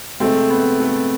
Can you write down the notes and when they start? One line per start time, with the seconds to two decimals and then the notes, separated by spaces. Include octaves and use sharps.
0.20 C3 G#3 A3 C4
0.50 B3
0.80 A3